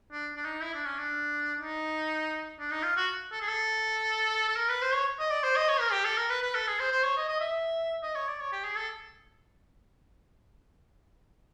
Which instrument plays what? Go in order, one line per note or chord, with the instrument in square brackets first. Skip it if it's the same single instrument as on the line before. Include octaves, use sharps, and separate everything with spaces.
[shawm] D4
D4
D#4
E4
D4
C#4
D4
D#4
D4
D#4
F4
F#4
A4
G#4
A4
A4
A#4
B4
C5
C#5
D#5
D5
C5
D#5
C#5
A#4
G4
A4
A#4
B4
B4
A4
G#4
C5
C5
C#5
D#5
D#5
E5
D#5
C#5
D5
C#5
G4
G#4
A4